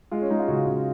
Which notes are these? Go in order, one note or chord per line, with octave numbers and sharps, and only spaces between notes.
G#3 F4
C#4
G#3 D#4
F4
C#3 F#4
C#3